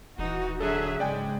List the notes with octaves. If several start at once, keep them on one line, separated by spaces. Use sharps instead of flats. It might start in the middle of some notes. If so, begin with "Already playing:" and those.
D#1 E3 D#4 F#4
D3 F#3 G#4 A4 E5
G#2 C#3 G#3 D5 G5 G#5